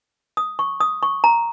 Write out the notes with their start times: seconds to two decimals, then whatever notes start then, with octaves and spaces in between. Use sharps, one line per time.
0.37 D#6
0.59 C#6
0.81 D#6
1.03 C#6
1.24 A#5